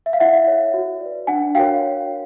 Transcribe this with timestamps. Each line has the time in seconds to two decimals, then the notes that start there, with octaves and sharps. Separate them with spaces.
0.06 E5
0.13 F5
0.20 E4 E5 F#5
0.47 A4 C#5
0.74 F#4
1.01 B4 D5
1.27 D4 F#5 G#5
1.55 F#4 A#4 C#5 F5 G5